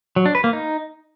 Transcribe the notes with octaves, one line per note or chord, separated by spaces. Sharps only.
F#3
D4
B4
A#3
D#4